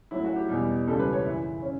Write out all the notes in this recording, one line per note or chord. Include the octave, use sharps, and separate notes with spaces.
A2 F#3 E4
F#4
G4
E2 B2 G3
C#2 C#3 E3 G3 A4
B4
C#5
F#2 C#3 E3 E4
C#3 C#4